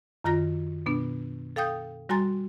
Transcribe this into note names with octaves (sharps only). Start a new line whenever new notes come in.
F#2 D#3 F4 A#5 A#6
B2 B3 D4
A4 F5 G5 D#6 G6
G3 F#4 G#5 A#5 C6 A6